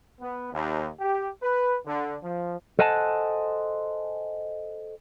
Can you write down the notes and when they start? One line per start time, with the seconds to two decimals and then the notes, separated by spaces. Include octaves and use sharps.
0.20 B3
0.52 D#2
1.00 G4
1.42 B4
1.85 D3
2.22 F3
2.79 A4 C5 D#5 F#5 G#5 A5